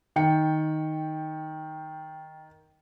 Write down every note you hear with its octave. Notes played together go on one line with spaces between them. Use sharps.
D#3 G5 C#7